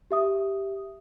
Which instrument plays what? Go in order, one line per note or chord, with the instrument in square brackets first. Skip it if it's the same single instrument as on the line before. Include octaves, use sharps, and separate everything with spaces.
[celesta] G4 E5 D#6